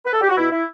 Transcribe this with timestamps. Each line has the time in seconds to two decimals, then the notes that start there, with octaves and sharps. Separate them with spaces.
0.05 B4
0.13 A4
0.21 G4
0.29 F#4
0.36 B2 E4
0.52 E4